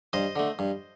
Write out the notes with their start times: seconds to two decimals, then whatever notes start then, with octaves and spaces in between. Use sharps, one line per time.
0.13 G2 C5 D#5
0.36 D3 A3
0.59 G2